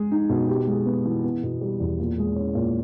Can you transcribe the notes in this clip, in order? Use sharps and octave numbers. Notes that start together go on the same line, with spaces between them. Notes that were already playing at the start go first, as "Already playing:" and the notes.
Already playing: G#3 G#4
D#4
B2
G4
G#3
B3
E3
B3
B2
G3
E2
A#2
G#3
C#4
A#2